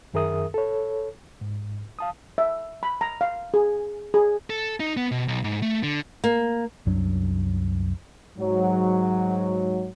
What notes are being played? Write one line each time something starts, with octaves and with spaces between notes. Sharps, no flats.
F#2 D#3 G#4 A#4 E5 D#6
A4 C#5
G#2
F5 A5 D#6
E5
B5
A#5
F5
G#4
G#4
A4
D#4
B3
B2
B1
G#2
A3
D3
A#3
C2 F#2 F#3 D4
G#2 F#3